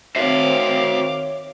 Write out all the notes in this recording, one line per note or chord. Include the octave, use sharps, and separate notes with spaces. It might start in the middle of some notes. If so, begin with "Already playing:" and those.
D#3 C4 F#4 C5 C#5 E5 F5 D6